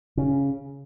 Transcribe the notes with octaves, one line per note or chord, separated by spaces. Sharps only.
C#3